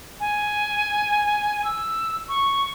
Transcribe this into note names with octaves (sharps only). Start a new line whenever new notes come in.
G#5
E6
C#6